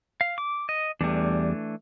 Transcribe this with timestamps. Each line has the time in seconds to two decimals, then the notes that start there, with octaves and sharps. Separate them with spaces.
0.21 F5
0.38 D6
0.69 D#5
1.01 E2 E3 G3 A3 D4